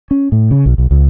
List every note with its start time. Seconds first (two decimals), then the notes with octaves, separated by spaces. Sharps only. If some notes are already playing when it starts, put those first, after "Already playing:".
0.11 C#4
0.32 A2
0.51 C#3
0.66 B1
0.78 B1
0.91 C#2